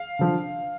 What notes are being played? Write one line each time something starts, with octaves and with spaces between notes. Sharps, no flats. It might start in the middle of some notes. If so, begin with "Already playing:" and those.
Already playing: F5
D3 F3